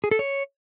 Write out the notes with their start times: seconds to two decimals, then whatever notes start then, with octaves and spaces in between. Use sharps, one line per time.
0.04 G#4
0.11 A4
0.19 C#5